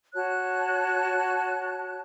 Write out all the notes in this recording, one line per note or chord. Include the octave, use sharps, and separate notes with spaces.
F#4 C#5 A5 F#6